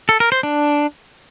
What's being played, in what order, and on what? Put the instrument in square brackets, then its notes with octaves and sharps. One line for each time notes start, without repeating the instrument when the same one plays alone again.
[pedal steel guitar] A4
A#4
C5
D4